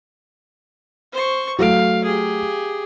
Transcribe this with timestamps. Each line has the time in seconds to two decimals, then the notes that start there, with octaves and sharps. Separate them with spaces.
1.13 C5 C#6
1.59 F#3 A3 F5 D7
2.04 G4 G#4